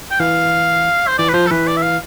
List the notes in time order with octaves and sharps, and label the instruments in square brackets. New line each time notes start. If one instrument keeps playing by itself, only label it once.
[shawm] G5
[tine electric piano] E3 [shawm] F5
[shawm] C5
[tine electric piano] E3 [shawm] D5
[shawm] B4
[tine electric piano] F3 [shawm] C5
[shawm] A4
[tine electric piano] E3 [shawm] B4
[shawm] D5
E5
F5